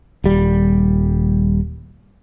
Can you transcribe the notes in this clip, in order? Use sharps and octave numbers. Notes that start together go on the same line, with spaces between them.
D#1 G3